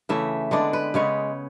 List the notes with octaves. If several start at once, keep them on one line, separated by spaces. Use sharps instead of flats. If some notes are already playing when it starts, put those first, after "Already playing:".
C#3 E3 A3 E5
D3 G#3 B3 D4 D5
B4
C#3 G#3 B3 C#5